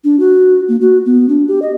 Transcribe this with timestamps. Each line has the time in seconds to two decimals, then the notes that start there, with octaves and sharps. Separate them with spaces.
0.04 D4
0.20 F#4
0.68 A#3
0.81 F#4
1.05 B3
1.29 D4
1.48 G4
1.62 D#5